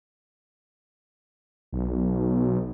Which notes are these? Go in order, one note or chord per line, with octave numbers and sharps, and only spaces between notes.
B1